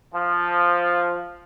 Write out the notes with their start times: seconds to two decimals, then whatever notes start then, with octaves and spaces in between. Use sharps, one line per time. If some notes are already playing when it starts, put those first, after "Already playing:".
0.14 F3